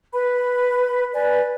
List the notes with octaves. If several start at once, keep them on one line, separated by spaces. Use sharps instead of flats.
B4 B5
B4 D5 G#5